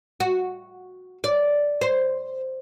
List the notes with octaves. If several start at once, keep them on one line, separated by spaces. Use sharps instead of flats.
F#4
D5
C5